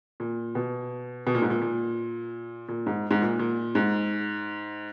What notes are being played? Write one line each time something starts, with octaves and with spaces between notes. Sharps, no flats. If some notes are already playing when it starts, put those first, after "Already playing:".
A#2
B2
B2
A#2
G#2
A#2
A#2
A#2
G#2
G#2
A#2
A#2
G#2